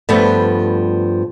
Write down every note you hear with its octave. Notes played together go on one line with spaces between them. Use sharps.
G2 F3 A3 B3